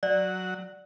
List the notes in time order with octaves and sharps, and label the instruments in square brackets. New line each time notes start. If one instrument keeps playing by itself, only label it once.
[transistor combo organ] F#3 F#5 [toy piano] D5